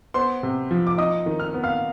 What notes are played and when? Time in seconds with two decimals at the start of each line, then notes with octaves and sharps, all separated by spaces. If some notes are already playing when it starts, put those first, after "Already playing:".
0.14 B3 C5 C6
0.43 C3
0.71 F3
0.87 D6
0.98 D#4 D#5 D#6
1.26 D#3
1.40 F6
1.54 B3
1.64 F5 F6